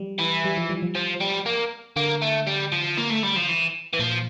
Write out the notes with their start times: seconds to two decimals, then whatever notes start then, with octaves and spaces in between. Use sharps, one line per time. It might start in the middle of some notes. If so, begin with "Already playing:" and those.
Already playing: F3 G3
0.19 E3
0.45 G3
0.57 F3
0.69 G3
0.82 F3
0.95 F3
1.20 G3
1.46 A#3
1.96 D3 A#3
2.22 A3
2.47 G3
2.72 F3
2.97 A#3
3.10 A3
3.23 G3
3.36 F3
3.48 E3
3.93 E3
3.99 A#2 F3